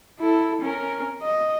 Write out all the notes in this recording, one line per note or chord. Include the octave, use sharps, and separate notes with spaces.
E4 A4
C#4 A#4
D#5